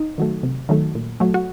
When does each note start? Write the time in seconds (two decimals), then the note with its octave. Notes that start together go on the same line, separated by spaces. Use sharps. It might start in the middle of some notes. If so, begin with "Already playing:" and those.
Already playing: D#4
0.18 D#3 F#3 A3
0.43 C3
0.69 D#3 F#3 A3
0.95 A#2
1.20 F#3 A3
1.34 F#4